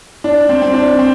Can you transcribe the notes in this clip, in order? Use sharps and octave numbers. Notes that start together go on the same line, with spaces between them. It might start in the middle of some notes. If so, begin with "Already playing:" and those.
D4
C4
C4
D4
C4